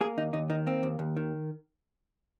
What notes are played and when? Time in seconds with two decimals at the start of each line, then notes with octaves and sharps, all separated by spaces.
0.01 A#3 G#4
0.18 D#2 D#4
0.33 D#2 D#4
0.50 D#3 D#4
0.66 A#3 C4
0.83 D#2
0.99 D#2
1.17 D#3